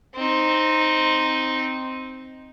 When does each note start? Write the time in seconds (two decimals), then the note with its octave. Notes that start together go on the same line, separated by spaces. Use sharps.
0.15 C4 D#4